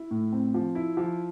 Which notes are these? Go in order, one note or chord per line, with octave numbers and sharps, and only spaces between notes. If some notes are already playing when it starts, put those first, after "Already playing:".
Already playing: E4
A2
C4
F3
E4
F3